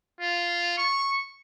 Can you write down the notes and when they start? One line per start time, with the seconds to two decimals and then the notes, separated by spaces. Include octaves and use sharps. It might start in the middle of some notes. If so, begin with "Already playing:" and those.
0.21 F4
0.78 C#6